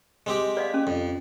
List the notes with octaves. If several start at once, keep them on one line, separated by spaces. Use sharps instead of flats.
G#3 C4 G4
D5 D#5 F5
C#4
F2